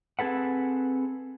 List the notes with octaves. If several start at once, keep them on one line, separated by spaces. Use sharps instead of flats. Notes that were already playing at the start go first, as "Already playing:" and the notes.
C4 G#4 A4 B4 F#5